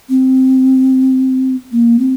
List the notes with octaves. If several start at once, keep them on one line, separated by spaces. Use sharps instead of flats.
C4
A#3
C4